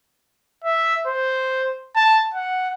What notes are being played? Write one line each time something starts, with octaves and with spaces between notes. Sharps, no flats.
E5
C5
A5
F#5